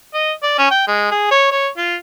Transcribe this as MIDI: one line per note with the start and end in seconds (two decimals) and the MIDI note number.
0.14 0.32 75
0.43 0.56 74
0.58 0.71 61
0.71 0.86 79
0.88 1.10 56
1.11 1.27 68
1.31 1.50 73
1.51 1.68 73
1.77 1.95 65